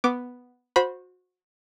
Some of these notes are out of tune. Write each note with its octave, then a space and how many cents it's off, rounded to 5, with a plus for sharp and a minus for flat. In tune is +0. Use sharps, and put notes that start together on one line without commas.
B3 +0 D6 +0
F#4 -25 C5 +5 B5 -15